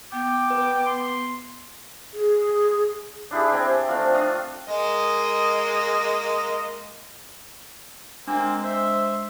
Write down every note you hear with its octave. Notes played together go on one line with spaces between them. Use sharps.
B3 G5 D6
B4
C6
G#4
D4 E4 G4 G#4
C4 G5 G#5
A3 C4 D4 F4
D4 F5 D#6
G#3 A#3 D#5
G#3 A#3 C4 D4
C5 E5